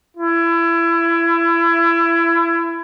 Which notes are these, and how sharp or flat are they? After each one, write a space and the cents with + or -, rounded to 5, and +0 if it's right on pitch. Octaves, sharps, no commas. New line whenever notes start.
E4 +25